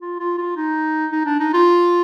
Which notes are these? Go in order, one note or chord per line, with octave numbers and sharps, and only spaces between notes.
F4
F4
F4
D#4
D#4
D4
D#4
F4